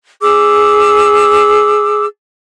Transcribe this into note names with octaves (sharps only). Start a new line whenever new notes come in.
G#4 D6 E6